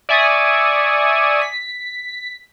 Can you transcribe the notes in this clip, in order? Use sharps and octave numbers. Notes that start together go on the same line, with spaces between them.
D5 E5 G#5 C#6 D#6
B6